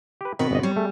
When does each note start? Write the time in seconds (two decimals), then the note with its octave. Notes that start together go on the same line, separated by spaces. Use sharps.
0.21 G4 B4
0.39 B2 D#3 C4 B4 F#5
0.51 G1 D#5
0.63 G3 C#5
0.76 A3 G#4